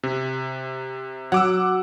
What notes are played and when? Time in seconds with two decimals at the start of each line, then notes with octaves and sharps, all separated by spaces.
0.03 C3
1.32 F#3 F#5 D6 E6